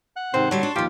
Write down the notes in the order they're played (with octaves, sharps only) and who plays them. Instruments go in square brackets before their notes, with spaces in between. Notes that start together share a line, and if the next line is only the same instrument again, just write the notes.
[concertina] F#5 F#6
[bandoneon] G#2 C3 C4 [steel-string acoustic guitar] D#3 [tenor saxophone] C5
[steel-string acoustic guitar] D3 G3 A3 [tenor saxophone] F#3 [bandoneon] A5 C6 C#6
[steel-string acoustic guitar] D4
[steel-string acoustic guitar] D#2 F3 [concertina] F4 [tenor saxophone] G4